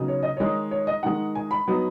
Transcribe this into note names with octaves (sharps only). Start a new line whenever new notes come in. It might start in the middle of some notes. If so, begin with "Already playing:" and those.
Already playing: C#3 F#3 B3 D#4
C#5
D#5
D#3 G#3 D#4 C#5
C#5
D#5
D#3 G#3 D#4 F#5
G#5
B5
F#3 B3 D#4